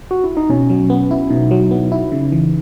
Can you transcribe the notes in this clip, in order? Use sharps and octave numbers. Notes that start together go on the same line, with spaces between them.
F#4
E4
D#4
B2 C#4
F#3
B3
E4
B2 D#4
F#3
B3
E4
C#3
E3